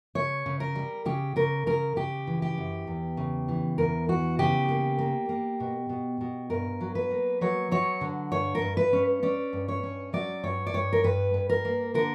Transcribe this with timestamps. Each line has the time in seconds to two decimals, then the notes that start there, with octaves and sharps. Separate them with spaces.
0.15 C#3 C#5
0.46 C#3
0.60 A#4
0.75 G3
1.06 C#3 G4
1.36 C#3 A#4
1.66 C#3 A#4
1.96 C#3 G4
2.27 E3
2.42 G4
2.58 F#2
2.87 E2
3.17 C#3
3.48 E3
3.78 E2 A#4
4.09 E3 F#4
4.39 C#3 G4
4.69 A#3
4.99 A#3
5.29 A#3
5.60 B2
5.89 B2
6.21 B2
6.50 G2 A#4
6.81 F#3
6.95 B4
7.11 A#3
7.41 F#3 C#5
7.71 F#3 C#5
8.01 D3
8.32 G2 C#5
8.55 A#4
8.62 G2
8.77 B4
8.93 C#4
9.23 C#4 D5
9.53 G2
9.68 C#5
9.83 C#4
10.13 F#3 D5
10.43 G2 C#5
10.67 D5
10.74 G2 C#5
10.93 A#4
11.04 G2 B4
11.34 G2
11.49 A#4
11.65 A#3
11.94 D3 A#4